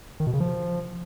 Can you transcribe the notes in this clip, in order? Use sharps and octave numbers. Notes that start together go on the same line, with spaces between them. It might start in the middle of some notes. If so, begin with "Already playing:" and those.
D#3
B2
C#3
F3